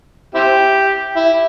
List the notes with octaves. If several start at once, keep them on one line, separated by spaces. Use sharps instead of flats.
C4 E4 G4
E4